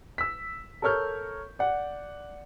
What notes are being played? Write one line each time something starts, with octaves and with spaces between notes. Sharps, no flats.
E6 B6
A4 A#4 C#5 C#6 F6 G6
D5 F#5